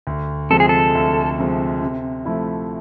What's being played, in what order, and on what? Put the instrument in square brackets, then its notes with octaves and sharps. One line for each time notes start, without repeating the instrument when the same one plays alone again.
[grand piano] D2
[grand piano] C3 F3 G#3 [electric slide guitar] A4
[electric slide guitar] G#4
A4
[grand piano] D2
C3 F3 G#3
C3
F3 A3 E4